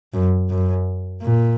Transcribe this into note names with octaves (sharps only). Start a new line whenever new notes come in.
F#2
F#2
A#2